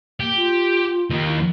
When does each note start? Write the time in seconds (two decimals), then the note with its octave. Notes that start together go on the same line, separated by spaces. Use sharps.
0.20 A#3 G4
0.36 F4
1.10 D#2 D#3
1.28 E4